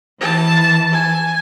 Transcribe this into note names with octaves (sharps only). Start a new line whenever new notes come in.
E3 A5
G#5